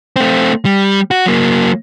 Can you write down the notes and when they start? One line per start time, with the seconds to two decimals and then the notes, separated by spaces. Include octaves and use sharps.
0.16 A3 C4
0.65 G3
1.11 F#4
1.26 F#3 A#3